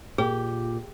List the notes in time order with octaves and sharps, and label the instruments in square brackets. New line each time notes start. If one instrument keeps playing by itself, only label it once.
[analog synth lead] A#2 [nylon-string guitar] G4 [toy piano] G#4